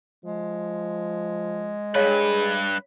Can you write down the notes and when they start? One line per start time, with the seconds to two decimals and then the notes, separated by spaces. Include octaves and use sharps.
0.25 F3 G#3
1.95 G2 G#4 B4 C#5 D#5 F5